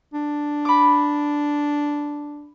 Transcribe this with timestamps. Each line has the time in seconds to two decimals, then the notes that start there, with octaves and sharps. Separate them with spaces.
0.14 D4
0.65 B5 D6